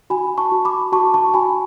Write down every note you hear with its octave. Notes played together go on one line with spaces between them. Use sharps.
F#4 G#5 B5
A5 C#6
F#4
B5 D6
F#4 A5 C#6
A5 C#6
F#4 G#5 B5